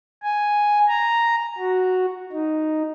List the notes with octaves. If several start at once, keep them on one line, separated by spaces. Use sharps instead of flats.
G#5
A#5
F#4
D#4